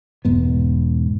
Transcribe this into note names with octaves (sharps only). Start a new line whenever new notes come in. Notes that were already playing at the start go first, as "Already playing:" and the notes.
E1 G#2 B3